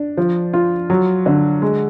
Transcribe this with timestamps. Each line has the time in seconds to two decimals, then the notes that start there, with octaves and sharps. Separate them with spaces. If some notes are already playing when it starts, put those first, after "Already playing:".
Already playing: D4
0.17 F3
0.53 F4
0.90 F#3
1.26 D3
1.62 G#3